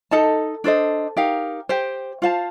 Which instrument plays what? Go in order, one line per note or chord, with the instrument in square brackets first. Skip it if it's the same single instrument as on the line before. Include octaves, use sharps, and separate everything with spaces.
[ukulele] D#4 A4 D#5 A5
D4 A4 C5 D#5
D#4 G4 A#4 F5
G4 C5 G5
F4 C5 F5 A5